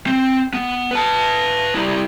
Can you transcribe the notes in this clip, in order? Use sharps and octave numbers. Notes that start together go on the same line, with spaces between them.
C4
B3
B4 A5
G3 E4